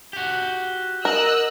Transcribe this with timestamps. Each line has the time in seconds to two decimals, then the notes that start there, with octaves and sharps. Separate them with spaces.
0.13 F#4 G4
1.05 A#4 D#5 E6 F#6